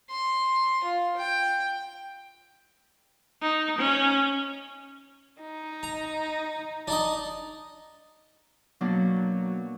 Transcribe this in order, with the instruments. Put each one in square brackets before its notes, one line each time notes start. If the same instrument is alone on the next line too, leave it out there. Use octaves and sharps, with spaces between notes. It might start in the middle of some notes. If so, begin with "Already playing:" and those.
[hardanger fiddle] C6
F4
G5
[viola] D#4
C#4
[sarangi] D#4
[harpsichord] A#5
D4 D#4 D#5
[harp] B2 A#3 D4 [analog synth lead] F#3